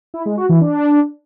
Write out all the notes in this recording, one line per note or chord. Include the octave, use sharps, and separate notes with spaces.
E4
G#3
F#4
E3
D4